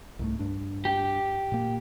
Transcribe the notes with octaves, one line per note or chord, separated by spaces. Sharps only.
C2 G#2 A3
G2 D4
G4
A#2 A#3